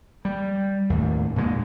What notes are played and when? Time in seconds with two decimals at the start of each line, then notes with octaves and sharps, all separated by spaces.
0.25 G3
0.90 D#2 A2
1.36 A#2 D3 D#3 G#3